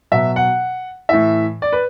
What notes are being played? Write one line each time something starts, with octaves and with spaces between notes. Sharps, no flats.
B2 F#3 E5
F#5
A2 E3 E5
D5
B4